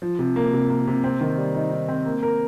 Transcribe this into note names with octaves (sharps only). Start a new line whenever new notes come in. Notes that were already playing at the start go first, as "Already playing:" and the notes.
F3
C3
A#3
C3
A#3
C3
C4
D#3
G3
D#4
D#4
C4
A#3
A#4